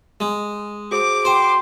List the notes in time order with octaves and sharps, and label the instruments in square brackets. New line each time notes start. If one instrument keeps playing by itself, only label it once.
[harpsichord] G#3
[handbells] F#4 G#4 C5 [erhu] D6
[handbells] F#4 G5 [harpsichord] C5 [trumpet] C6